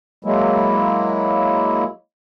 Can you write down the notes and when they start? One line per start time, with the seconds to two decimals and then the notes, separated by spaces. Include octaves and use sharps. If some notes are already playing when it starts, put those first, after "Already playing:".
0.25 F#3 G#3 A#3 E4